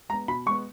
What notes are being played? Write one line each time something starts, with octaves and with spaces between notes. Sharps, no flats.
G#3 B3 A#5
B2 B5
G#3 B3 C#6